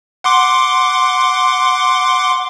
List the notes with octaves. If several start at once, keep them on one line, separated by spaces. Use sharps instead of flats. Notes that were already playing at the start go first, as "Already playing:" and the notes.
F#5 C6 D6